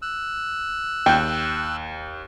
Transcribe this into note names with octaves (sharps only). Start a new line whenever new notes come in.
E6 F#6
D#2 G5 G6